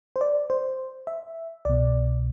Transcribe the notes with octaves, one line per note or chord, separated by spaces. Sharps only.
C5
D5
C5
E5
C2 B2 D5